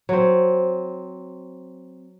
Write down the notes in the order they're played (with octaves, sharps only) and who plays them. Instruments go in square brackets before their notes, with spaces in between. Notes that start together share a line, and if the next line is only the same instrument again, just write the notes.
[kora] F#3 C4